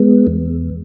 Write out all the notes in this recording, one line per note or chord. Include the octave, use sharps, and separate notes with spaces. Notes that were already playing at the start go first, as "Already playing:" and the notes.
Already playing: G#3 B3
E2